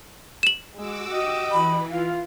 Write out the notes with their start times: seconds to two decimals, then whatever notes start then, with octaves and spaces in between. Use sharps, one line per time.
0.43 E7 F#7
0.76 G#3 F#4 D6 E6
1.12 G4 D#5
1.52 E3 B5
1.91 F4 F5